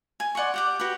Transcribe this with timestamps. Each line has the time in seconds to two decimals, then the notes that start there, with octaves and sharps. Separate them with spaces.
0.20 G#5
0.35 D5 F#5 C6 C#6
0.54 G4 F#5 D6
0.80 F#4 G4 B4